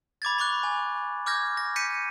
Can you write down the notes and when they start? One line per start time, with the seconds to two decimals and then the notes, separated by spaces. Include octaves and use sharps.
0.22 B5 D6 G#6 A6
0.38 B5 C#6 D6 F#6
0.63 G#5
1.26 D6 F6 G6 G#6 A#6
1.57 A#6
1.76 G6 B6 C#7 D#7